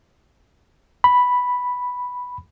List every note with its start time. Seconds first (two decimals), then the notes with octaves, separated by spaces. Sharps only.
1.04 B5